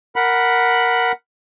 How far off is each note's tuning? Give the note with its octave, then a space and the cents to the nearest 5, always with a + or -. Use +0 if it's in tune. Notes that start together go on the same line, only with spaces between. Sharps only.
A#4 +0 F#5 +0 B5 +0